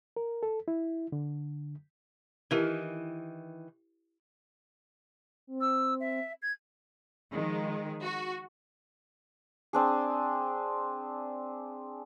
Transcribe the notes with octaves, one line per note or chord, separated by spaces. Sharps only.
A#4
A4
E4
D3
D#3 E3 E4 G4 A#4
C4
E6
E5
G#6
D#3 F3 G#3
F#4
C4 D4 G#4